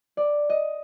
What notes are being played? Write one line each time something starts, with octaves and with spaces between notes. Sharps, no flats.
D5
D#5